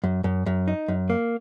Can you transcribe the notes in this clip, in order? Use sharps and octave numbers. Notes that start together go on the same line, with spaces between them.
F#2
F#2
F#2
D#4
F#2
A#3